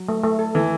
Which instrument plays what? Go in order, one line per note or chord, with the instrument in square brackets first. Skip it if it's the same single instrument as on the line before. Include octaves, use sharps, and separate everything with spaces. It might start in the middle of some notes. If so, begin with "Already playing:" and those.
Already playing: [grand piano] F#3
[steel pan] A3
A3
A4
[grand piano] E3 [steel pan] A4